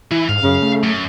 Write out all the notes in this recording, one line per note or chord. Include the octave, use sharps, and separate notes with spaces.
E3 E4
G#2 F5
F#2 C#3
A3
F#2